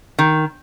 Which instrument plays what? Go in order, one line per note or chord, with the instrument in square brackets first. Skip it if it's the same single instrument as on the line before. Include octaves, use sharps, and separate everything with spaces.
[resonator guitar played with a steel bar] D#3